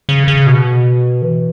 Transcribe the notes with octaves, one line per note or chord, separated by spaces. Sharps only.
C#3
C#3
B2
E3